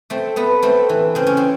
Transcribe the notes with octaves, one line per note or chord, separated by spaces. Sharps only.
A3 C4
A3 B3
A3 C4
E3
C#3 C4
C#4
C4